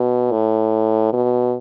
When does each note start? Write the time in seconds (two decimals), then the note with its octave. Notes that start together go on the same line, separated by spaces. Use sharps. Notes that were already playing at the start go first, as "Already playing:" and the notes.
Already playing: B2
0.32 A2
1.13 B2